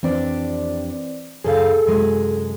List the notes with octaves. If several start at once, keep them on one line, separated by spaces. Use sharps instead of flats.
F2 E3 C4 D4 G4 D5
F#2 C#3 G#4 A4 F5
F#2 C3 G#3